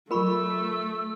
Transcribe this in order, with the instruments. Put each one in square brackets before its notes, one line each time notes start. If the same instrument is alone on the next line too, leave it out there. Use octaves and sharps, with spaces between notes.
[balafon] F#3 F4 [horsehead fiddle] A3 [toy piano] A#4 B5 C#6 [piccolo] E6